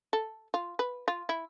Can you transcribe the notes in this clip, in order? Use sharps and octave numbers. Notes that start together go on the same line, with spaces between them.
A4
F4
B4
F4
E4